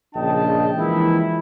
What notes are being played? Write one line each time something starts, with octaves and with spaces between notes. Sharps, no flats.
A#1 C#3 D4 D#5 G5 A5
E3 F3 G#3 A#3 E4